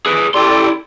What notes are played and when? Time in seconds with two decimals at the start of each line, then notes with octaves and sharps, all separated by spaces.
0.06 G#4 B4
0.34 E4 G4 A4 D5 C6